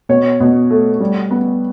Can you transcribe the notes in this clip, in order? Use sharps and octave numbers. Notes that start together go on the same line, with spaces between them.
B2 C#5
B2
A3
G3
B3